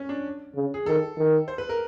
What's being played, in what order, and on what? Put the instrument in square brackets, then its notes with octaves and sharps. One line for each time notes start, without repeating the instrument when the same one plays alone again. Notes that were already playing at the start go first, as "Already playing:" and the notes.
Already playing: [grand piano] C#4
D4
[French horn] C#3
[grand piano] G#4
[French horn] D#3 [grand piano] A4
[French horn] D#3
[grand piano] C5
B4
A#4